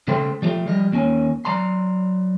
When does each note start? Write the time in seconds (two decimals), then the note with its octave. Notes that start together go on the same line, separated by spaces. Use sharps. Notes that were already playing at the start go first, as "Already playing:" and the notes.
0.08 C#3 A3 A4 C5 G5 C6
0.42 F3 G3 A3 F4 G4
0.66 F3 G3 D#5
0.92 D#2 A#3 C#4 G#5
1.45 F#3 D5 A#5 C6